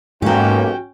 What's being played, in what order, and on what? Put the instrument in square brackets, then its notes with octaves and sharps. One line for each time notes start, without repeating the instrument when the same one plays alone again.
[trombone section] B1 A#3 [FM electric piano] G#2 [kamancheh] C#4 G5 [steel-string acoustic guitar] F#4 G4